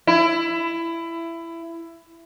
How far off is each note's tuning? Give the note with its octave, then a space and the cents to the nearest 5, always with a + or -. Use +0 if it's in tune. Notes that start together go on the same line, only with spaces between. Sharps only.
E4 +20